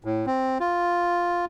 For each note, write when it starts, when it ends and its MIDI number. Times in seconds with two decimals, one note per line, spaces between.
0.04 0.26 45
0.26 0.58 60
0.60 1.45 65